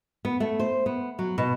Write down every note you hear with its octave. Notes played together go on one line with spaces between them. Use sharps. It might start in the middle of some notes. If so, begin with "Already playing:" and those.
B3
A3
C5
B3
F#3
B2